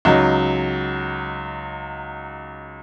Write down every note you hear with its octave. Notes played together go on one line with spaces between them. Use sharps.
C#2 F#3 D#4